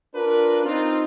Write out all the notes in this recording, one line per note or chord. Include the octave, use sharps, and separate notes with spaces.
D4 F4 A#4 B4
C4 D#4 F4